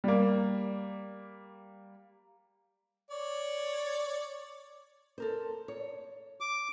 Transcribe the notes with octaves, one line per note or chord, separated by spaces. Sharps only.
G3 A#3
C#5 D5
A4 A#4 C5
C#5
D6